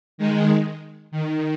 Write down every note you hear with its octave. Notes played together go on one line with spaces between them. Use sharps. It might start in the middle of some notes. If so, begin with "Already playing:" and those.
D#3 G#3
D#3